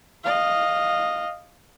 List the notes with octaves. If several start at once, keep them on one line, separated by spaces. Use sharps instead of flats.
D#5 F5